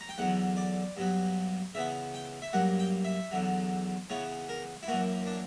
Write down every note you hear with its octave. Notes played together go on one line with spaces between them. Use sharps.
A#5
G5
E2 D3 F#3 F#5
D5
G2 F#3 B3
C#3 E3 B3 E5
G5
E5
G2 F#3 A#3 F#5
G5
E5
E2 D3 F#3
C#3 E3 B3 C#5
A#4
E4
F#2 E3 A#3 F#4
D4